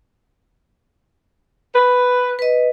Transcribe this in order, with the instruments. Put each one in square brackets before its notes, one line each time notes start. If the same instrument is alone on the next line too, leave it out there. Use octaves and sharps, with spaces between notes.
[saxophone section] B4
[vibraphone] B4 D#5